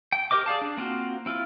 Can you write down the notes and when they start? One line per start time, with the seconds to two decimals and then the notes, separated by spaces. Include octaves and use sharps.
0.12 G5
0.31 G4 A#4 C5 D#5 D6
0.46 G#4 D5 F5 A5
0.61 D4
0.77 A#3 C4 F4 F#4
1.26 C4 E4 F4